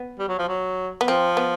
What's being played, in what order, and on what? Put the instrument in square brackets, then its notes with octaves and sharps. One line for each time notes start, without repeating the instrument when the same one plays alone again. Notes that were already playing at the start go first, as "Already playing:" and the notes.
Already playing: [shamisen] B3
[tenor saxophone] G3
F#3
F3
F#3
[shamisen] B3
[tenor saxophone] F3 [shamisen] C4
[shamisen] B3